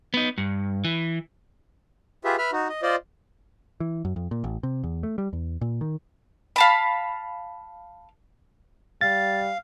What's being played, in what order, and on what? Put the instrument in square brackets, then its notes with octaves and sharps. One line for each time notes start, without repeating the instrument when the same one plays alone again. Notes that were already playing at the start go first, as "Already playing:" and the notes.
[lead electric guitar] B3 D#4
G2
E3
[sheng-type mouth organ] F4 G4 G#4 B4 E5
B4 E5 B5 F6
D#4 F#4
D#5
F4 C5 D5 D#5
[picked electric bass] E3
F#2
F2
A#2
A1
C3
E2
A3
G3
E2
A#2
D#3
[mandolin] F5 A5 B5
[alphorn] G3 [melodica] F5 [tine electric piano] A6